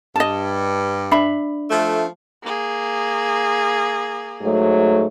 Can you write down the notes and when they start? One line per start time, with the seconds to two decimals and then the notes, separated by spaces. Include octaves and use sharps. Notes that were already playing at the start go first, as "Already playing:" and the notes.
0.16 G2 D#5 A5
1.11 D4 E5 B5
1.70 F3 A3
2.43 A#3 G#4
4.42 G#2 F#3 A3